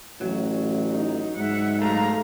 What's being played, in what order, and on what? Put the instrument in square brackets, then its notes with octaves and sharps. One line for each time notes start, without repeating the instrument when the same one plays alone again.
[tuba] A1 [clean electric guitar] F#3
[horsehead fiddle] D#4
[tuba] G#2 [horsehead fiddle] E5 F#5
[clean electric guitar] F#3 A3 [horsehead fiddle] F5 A#5